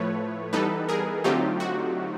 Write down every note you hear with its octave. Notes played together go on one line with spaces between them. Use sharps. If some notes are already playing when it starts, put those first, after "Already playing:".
Already playing: A2 F3 A3 B4 C#5
E3 G3 B3 D#4 A4 B4
G#4 A#4
D3 F#3 A3 C4 D#4 F4 G4
F#4